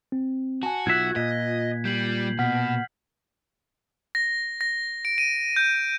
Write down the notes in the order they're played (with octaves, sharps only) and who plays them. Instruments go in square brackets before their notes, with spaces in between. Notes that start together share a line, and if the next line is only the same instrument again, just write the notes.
[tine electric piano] C4
[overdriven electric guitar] F#4 [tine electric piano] G#5 A5
[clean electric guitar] B1 E5 [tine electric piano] F4 F#6 [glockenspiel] G#6
[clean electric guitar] A#2 [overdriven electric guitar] D#5 [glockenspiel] B6
[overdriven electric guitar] G3 [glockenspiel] G6 C7 F#7
[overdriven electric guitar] B2 [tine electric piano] F#5 [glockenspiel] F6 B6
[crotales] A#6
A#6
D7
D#7
G6